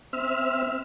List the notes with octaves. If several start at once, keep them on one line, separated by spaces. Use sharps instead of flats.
C4 E5 F6